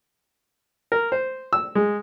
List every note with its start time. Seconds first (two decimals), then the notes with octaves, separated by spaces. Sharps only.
0.92 A#4
1.12 C5
1.53 E6
1.75 G#3